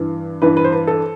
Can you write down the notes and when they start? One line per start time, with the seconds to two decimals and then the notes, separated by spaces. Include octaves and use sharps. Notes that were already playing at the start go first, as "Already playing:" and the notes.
Already playing: G2 E3
0.42 G2 E3 B4
0.57 B4
0.64 C5
0.72 B4
0.87 A4